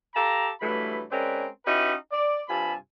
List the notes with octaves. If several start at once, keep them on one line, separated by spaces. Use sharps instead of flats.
G4 A4 F5 A5 A#5
G2 E3 F#3 A3 B5
G#3 C4 C#4 A#4 B4 D5
C#4 D#4 E4 F#4 G4 B4
D5
G2 C3 F4 G#5 A5 B5